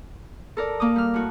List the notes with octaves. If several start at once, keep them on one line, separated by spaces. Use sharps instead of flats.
A4 A#4 D5
A#3 D6 D#6
G3 F6
A2 F#4